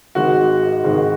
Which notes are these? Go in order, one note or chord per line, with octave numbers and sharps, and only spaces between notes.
G#1 G#2 D#3 G#3 F#4
G#1 G#2 D#3 G#3